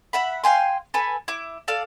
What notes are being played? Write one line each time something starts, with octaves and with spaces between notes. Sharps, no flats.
E5 F#5 B5
F5 G5 G#5 C6
A4 B4 G#5
E4 D6
A4 D5 F5